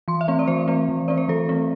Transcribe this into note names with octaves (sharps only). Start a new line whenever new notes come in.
E3 C6
E5
A3 C4
D5
E3 C5
A3 C4
E3
A3 C4 D5
C5
E3 A4
A3 C4